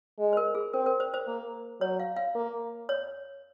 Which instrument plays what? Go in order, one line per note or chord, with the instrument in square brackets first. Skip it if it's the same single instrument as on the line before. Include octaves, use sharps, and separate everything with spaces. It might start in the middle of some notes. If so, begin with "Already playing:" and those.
[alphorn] G#3
[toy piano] C5
A#4
G#4
[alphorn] C4 [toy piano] A#4
[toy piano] A#4
C5
C5
[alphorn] A#3
[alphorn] F#3 [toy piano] C#5
[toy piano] F5
F5
[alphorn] A#3
[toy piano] C#5